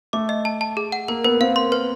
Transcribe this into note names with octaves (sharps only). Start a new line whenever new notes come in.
A3 D6
D#5
A5
A5
G#4
F#5
A#3 A#4
B3 A#4
C4 F5
C6
B4